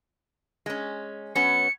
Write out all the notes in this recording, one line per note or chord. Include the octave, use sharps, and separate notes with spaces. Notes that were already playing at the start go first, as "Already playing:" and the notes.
G#3 C#4
F#3 B3 C#4 C#7